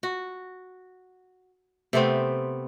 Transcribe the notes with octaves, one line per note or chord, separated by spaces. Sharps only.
F#4
C3 A3 B3 C4